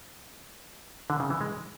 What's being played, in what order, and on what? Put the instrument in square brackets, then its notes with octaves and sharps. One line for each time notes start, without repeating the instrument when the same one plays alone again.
[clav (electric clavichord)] D3
C#3
E3
G#3